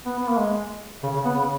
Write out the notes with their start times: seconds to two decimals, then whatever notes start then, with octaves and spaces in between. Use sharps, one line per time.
0.05 B3
0.19 B3
0.29 A#3
0.38 G#3
1.03 C#3
1.13 C#3
1.25 B3
1.35 C#3